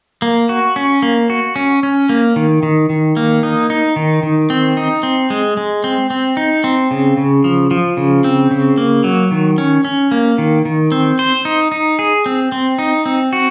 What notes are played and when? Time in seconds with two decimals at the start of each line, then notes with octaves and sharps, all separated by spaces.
0.22 A#3
0.49 F#4
0.76 C#4
1.02 A#3
1.30 F#4
1.56 C#4
1.83 C#4
2.09 A#3
2.36 D#3
2.63 D#3
2.89 D#3
3.17 A#3
3.43 D#4
3.70 D#4
3.96 D#3
4.23 D#3
4.50 C4
4.77 D#4
5.03 C4
5.30 G#3
5.57 G#3
5.84 C4
6.10 C4
6.37 D#4
6.64 C4
6.91 C#3
7.17 C#3
7.44 F3
7.71 F3
7.97 C#3
8.24 C4
8.51 C#3
8.77 A#3
9.04 F#3
9.31 D#3
9.58 C#4
9.85 C#4
10.11 A#3
10.38 D#3
10.65 D#3
10.92 C4
11.19 C5
11.45 D#4
11.72 D#4
11.99 G#4
12.26 C4
12.52 C4
12.78 D#4
13.06 C4
13.33 F#4